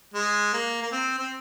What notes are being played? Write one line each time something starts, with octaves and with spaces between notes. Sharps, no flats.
G#3
A#3
A#3
C4
C4